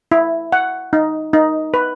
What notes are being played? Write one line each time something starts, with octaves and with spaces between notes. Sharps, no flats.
E4
F#5
D#4
D#4
B4